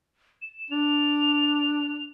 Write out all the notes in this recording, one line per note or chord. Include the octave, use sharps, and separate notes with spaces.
E7
D4 F7